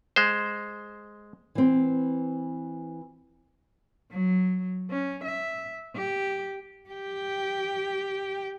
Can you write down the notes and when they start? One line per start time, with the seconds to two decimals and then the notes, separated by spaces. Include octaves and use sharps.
0.16 G#3 C5
1.55 E3 C4
4.12 F#3
4.90 C#4
5.24 E5
5.96 G4
6.90 G4 G5